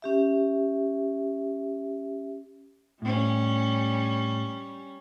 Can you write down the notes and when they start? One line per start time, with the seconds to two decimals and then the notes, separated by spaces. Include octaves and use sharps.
0.02 C#4 G4 E5
3.02 A2 G3 C#4